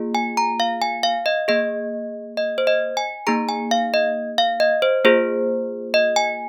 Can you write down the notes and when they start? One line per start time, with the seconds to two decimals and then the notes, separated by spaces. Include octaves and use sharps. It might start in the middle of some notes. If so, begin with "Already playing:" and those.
Already playing: A#3 F4 G#4
0.15 G#5
0.37 A#5
0.60 F5
0.82 G#5
1.03 F5
1.26 D#5
1.48 A#3 G#4 D#5
2.37 D#5
2.58 C5
2.67 D#5
2.97 G#5
3.27 A#3 D#4 G#4 A#5
3.49 G#5
3.71 F5
3.94 D#5
4.38 F5
4.60 D#5
4.82 C5
5.05 A#3 F4 G#4 C5
5.94 D#5
6.16 G#5